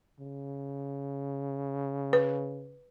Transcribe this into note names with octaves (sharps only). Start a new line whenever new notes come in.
C#3
B4